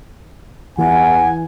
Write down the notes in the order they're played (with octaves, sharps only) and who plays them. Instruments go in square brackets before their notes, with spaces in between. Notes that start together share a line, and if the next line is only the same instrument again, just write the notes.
[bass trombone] E2 [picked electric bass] E3 [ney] F#5 [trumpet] G#5